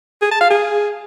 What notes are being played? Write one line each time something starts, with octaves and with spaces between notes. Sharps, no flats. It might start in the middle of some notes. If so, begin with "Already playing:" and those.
G#4
A5
F5
G#4